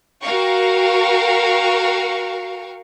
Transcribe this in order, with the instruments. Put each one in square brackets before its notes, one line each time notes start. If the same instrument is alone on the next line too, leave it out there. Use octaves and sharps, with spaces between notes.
[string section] F#4 A#4 F5 G5 C#6